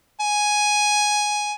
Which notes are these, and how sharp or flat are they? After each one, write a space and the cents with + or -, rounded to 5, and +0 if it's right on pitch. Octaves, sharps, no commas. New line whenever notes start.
G#5 +5